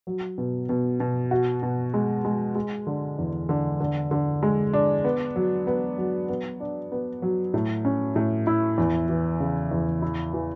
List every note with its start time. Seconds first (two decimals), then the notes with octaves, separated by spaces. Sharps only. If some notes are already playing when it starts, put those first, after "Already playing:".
0.07 F#3
0.38 B2
0.69 B2
1.00 B2
1.31 F#4
1.63 B2
1.94 G#3
2.25 G#3
2.55 G#3
2.87 D3
3.18 E2
3.49 D3
3.80 D3
4.11 D3
4.43 G#3
4.73 D4
5.04 B3
5.36 F#3
5.67 B3
5.98 F#3
6.29 B3
6.60 D4
6.92 B3
7.22 F#3
7.54 A2
7.85 C#4
8.16 A2
8.47 E4
8.78 E2
9.09 E3
9.40 C#3
9.72 E2
10.02 E4
10.33 E3